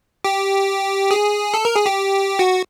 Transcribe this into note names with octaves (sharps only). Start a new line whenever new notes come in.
G4
G#4
A4
A#4
G#4
G4
F#4